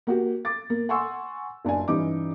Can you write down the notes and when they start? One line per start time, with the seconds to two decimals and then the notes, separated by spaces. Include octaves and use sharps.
0.07 A#3 F#4 G4
0.45 D6 A6
0.70 A#3
0.89 F#5 G#5 C6 C#6 E6
1.65 F#1 D4 D5 G#5
1.88 G2 E3 C#4 D#4 D6